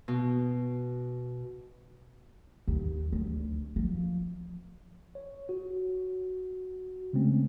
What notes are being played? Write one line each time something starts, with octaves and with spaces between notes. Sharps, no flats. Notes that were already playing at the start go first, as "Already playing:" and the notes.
B2
D#2
D2
F3
C#5
F#4
C#3 G#3 A3 C4 C#4